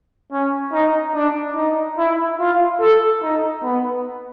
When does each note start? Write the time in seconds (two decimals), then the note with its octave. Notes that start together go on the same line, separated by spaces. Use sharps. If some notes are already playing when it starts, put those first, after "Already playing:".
0.32 C#4
0.73 D#4
1.15 D4
1.56 D#4
1.98 E4
2.40 F4
2.80 A4
3.23 D#4
3.63 B3